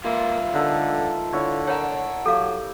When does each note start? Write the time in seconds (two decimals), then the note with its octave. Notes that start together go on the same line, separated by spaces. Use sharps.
0.04 A#3 F4 B4 E5 F5 C6
0.54 D3 D#4 A4 A#4
1.33 D3 E4 C#5
1.67 A#4 C#5 F#5 A5
2.26 F#3 G4 A4 F5